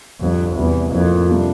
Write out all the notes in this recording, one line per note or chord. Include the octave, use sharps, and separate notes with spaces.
F2 D3 G3 D4 F4
E2 C3 E3 G3
F2 A2 F3 A#3 F4
C3 G3 A#3 D4 F4